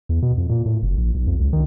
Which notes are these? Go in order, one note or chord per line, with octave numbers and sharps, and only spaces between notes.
E2
B2
F2
A#2
A2
F#1
A#1
B1
F2
C#2
D#3